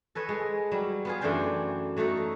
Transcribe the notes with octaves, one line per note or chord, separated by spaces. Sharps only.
A4 B4 C#5 D#5
G#3
F#3 G3
B3 F4 G#4
F#2 E3 A3 D4 G5 C6
F#3 A3 D#4 F#4 A4